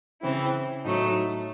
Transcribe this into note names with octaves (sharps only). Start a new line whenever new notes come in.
C#3 E3 C4 E4
A2 F#3 A3 D#4